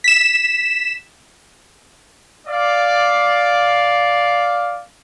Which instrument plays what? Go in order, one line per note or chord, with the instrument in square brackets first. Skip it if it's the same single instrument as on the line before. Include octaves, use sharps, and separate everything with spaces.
[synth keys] B6 E7
[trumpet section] D5 F5